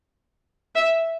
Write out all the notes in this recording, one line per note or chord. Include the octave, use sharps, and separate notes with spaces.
E5